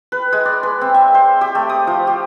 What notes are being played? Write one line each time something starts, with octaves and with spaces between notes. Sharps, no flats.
B4
G#3
D5
B4
C4
E5
C5
G4
A3
D#6
F3
G4